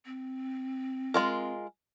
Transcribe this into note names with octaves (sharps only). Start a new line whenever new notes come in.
C4
G#3 F4 A#4